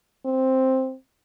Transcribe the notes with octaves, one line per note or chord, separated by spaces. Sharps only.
C4